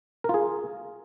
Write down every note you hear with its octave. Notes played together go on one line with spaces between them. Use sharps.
F4 G#4 A#4